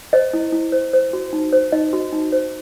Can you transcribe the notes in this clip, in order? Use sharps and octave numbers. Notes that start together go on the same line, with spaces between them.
C5 D#5
E4
E4
C5
C5
F#4
D#4
C5
D#4 D#5
F#4
D#4
C5